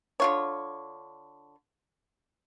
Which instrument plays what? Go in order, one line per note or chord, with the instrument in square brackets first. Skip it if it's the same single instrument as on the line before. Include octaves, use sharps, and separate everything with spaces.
[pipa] D3 F4 C#5